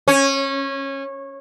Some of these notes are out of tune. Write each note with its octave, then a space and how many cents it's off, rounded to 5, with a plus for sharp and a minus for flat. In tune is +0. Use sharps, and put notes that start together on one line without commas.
C#4 -20